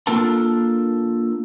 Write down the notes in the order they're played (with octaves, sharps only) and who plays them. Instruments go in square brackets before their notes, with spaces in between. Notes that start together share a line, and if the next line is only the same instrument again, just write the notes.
[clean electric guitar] A#3 D4 F4 A4 A#4 A5